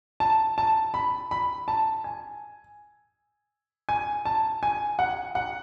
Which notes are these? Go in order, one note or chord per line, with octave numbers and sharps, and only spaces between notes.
A5
A5
B5
B5
A5
G#5
G#5
A5
G#5
F#5
F#5